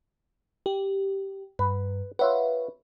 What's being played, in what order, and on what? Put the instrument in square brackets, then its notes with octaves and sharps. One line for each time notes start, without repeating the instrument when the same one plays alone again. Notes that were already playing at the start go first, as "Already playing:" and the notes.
[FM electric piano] G4
[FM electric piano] G2 [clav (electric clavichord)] B4
[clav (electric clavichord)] F4 E5 F#5 [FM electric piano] B4 C#5